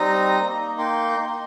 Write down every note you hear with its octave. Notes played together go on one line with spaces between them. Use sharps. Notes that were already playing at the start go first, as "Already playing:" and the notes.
Already playing: G3 C4 D#4 A#5 D#6
A#3 D#4
G5 C6
A#3 D#4